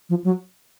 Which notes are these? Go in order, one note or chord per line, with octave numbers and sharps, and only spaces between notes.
F3
F#3